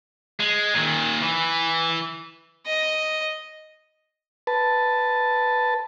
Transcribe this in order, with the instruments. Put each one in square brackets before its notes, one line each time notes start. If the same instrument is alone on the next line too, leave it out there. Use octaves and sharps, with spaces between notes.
[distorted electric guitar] G#3
A#2 D#3
E3
[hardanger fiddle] D#5
[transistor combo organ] B4 A5